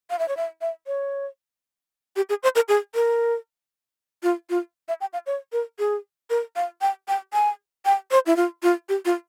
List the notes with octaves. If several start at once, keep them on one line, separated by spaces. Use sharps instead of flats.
F5
E5
C#5
E5
E5
C#5
G4
G#4
C5
A#4
G#4
A#4
F4
F4
E5
G5
F5
C#5
A#4
G#4
A#4
F5
G5
G5
G#5
G5
C5
E4
F4
F4
G4
F4